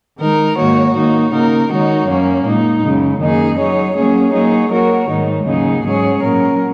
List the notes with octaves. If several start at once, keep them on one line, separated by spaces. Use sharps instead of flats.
D#3 G#3 D#4 A#4
G#2 D#3 A#3 F#4 C#5
D#3 A#3 D#4 F#4
C#3 A#3 D#4 A#4
D#3 G#3 D#4 F#4 C#5
F#2 F#3 A#3 C#4
A#2 G#3 D#4
F#2 C#3 G#3
F#2 D#3 A#3 D#4 G#4
F#3 D#4 G#4 C#5
F#3 A#3 C#4 G#4 C#5
F#3 A#3 D#4 G#4 C#5
F#3 A#3 F#4 A#4 C#5
G#2 D#3 G#3 D#4
D#2 C#3 F#3 D#4 G#4
G#2 F#3 C#4 G#4 C#5
A#2 F#3 C#4 A#4